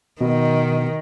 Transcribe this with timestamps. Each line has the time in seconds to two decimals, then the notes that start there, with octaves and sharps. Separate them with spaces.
0.21 B2 D#3